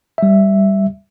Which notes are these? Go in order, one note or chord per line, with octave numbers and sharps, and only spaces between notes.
G3 E5